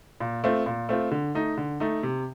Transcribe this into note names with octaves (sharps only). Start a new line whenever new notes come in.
A#2
A3 C4 F4
A#2
A3 C4 F4
D3
A3 D#4
D3
A3 D#4
C3